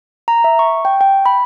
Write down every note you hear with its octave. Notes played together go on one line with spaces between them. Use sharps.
A#5
E5
C#6
G5
G5
B5